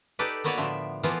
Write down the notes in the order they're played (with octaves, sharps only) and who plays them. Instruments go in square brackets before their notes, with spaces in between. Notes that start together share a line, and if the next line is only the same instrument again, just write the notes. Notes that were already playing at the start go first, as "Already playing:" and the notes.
[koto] D#4 G4 A4 B4 D5
A#3 B3 F#4 B4 C#5 D5
A2 D3 F3 E5
E3 F3 A#3 B3 F4